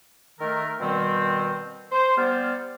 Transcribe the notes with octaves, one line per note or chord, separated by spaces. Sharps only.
D#3 A3 A#4
B2 D#3 G3 C4
C5
G3 B3 C5 D5 F6